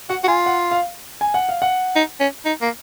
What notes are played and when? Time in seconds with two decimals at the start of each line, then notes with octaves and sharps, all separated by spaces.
0.10 F#4 F#5
0.24 F#4
0.28 F4 G#5
0.46 F#5
0.71 F5
1.21 G#5
1.34 F#5
1.49 F5
1.62 F#5
1.96 D#4
2.20 C#4
2.46 D#4
2.62 A#3